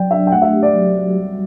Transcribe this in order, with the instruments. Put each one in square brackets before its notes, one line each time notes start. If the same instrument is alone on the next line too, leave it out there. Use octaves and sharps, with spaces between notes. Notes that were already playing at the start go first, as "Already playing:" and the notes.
Already playing: [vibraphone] F#3 D5 [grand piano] G5
[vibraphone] D4 [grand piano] E5
[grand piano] G5
[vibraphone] A3 [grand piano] F#5
[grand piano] E5
[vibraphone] G4
[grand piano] D5
[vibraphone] F#3
F#4
G3